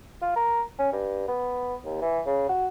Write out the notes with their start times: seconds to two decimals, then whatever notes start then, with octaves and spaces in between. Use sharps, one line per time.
0.22 F4
0.36 A#4
0.79 C#4
0.92 G2
1.28 B3
1.85 D#2
2.01 E3
2.26 C#3
2.49 F#4